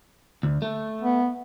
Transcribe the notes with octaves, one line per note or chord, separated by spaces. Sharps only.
D2
A3
B3